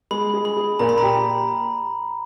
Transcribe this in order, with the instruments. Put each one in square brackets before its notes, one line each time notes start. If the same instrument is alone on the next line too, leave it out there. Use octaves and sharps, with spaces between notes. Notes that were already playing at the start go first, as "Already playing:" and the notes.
[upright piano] G#3 [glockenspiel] B5
[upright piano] G#4
[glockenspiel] B5
[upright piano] G#4
[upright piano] A#2 [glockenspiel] A#5
[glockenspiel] B5
[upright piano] G4 [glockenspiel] A#5